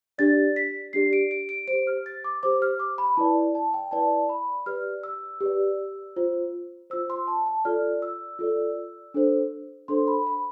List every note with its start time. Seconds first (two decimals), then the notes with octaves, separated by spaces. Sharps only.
0.18 D4 G4 D5 A6
0.56 B6
0.93 D4 G4 D5 C7
1.13 D7
1.31 D7
1.49 D7
1.68 C5 D7
1.73 G4
1.87 F6
2.06 A6
2.24 D6
2.43 G4 C5 D6
2.62 F6
2.79 D6
2.98 B5
3.17 E4 B4 D5 A5
3.55 A5
3.74 G5
3.91 E4 B4 D5 A5
4.29 B5
4.66 G4 B4 D5 F6
5.03 E6
5.41 G4 B4 D5
6.16 F4 C5
6.90 F4 C5 E6
7.10 C6
7.27 A5
7.46 A5
7.65 F4 A4 D5 F6
8.02 E6
8.39 F4 A4 D5
9.14 D4 A4 C5
9.88 D4 A4 C5 C6
10.08 B5
10.27 B5